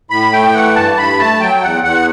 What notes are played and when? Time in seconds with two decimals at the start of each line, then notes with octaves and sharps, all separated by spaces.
0.10 A2 B5
0.32 A3 G5
0.54 E3 F#5
0.75 G2 A5
0.97 G2 B5
1.19 A3 A5
1.40 F#3 G5
1.62 E2 F#5
1.84 E2 F#5